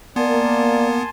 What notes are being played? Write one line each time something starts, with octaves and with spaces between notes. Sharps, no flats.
A#3 B3 D5 G#5 A5 C6